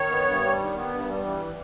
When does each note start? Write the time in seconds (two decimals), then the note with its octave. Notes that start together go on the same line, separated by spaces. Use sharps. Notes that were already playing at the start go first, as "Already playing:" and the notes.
Already playing: D#3 C#5
0.11 B3
0.26 G2
0.43 G3
0.59 D#3
0.76 B3
0.92 G2
1.09 G3
1.25 E3